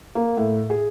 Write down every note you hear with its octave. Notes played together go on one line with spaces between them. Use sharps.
A#3
A2
G#4